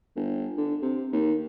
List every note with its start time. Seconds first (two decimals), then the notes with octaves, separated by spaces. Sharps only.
0.16 G1
0.57 D3
0.82 C3
1.12 D#2